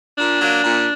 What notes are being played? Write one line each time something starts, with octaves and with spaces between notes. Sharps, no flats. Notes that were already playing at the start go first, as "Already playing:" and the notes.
A#2 D4
F#3 A#3
A#2